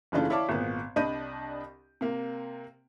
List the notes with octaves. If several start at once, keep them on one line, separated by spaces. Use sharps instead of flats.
F#1 C#3 E3 A3 D4 F4
E4 C#5 D5 F5 A5 D6
G#1 A#2 B3
C2 D4 D#5 B5 G6 D#7
C3 A#3